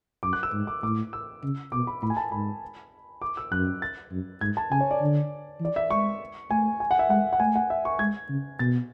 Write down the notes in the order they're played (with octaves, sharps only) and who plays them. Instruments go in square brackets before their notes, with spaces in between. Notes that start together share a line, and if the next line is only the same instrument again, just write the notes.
[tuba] F#2 [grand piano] D6
[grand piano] F#6
E6
[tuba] G#2
[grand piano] D6
[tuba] A2 [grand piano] D6
[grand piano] E6
[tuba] C#3
[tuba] B2 [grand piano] D6
[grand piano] B5
[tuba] A2 [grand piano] B5
[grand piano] G#5
A5
[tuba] G#2 [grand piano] B5
[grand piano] D6
E6
[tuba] F#2 [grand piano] F#6
[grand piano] A6
[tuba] F#2
[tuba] G#2 [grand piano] G#6
[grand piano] A5
[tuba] C#3 [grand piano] G#5
[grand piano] C#5
D5
[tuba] D3
E3
[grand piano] D5
E5
[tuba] G#3 [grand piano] C#6
[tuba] A3 [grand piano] G#5
[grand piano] G#5
F#5
E5
[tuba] G#3 [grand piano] F#5
[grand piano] F#5
[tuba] A3 [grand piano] G#5
[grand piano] F#5
E5
C#6
[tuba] G#3 [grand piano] G#6
[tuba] C#3
[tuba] B2 [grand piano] A6